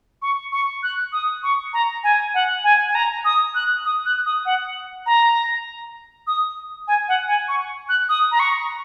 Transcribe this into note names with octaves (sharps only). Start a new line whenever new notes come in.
C#6
C#6
F#6
D#6
C#6
A#5
G#5
F#5
G#5
G#5
A#5
D#6
F#6
D#6
F#6
D#6
F#5
A#5
D#6
G#5
F#5
G#5
C#6
F#6
D#6
A#5
C#6